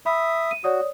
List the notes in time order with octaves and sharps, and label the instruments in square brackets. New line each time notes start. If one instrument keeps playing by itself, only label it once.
[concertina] E5 D#6 [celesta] B5
[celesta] D#7
[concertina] F#4 [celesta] C#5 D5 D#6